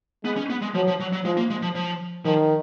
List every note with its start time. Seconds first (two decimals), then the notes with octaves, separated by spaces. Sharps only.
0.24 G#3 B3
0.37 C#4
0.50 B3
0.62 G#3
0.74 F3 F#3
0.87 F3
1.00 F#3
1.13 F#3
1.25 F3 G#3
1.37 A#3
1.50 G#3
1.62 F3
1.75 F3
2.25 D#3 F3